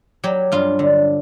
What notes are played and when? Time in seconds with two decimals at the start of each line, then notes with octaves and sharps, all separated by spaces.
0.24 F#3 G4
0.52 G2 F4
0.79 D3